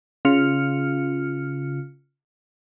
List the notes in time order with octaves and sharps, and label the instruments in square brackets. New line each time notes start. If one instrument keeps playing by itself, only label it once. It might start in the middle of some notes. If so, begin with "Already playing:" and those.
[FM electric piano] C#3 F4 F6 C#7